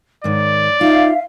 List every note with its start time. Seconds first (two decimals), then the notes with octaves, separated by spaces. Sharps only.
0.24 G#2 D#3 C#5 D5
0.81 D#4 F4 E5 F5